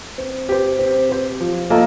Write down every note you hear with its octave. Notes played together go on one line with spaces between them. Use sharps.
C4
G4 C5
C4
G4 C5
F3
A#3 F4 A4 D#5